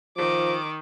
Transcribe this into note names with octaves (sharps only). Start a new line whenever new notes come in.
D#3 F3 D6